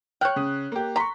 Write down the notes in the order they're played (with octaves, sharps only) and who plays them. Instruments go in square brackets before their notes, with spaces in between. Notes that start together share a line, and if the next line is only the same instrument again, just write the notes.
[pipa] C#5 G5 [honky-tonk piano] F6 F#6
[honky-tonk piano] C#3 D#6
A#3 G4
[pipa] A#5 C6 [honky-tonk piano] C#6 B6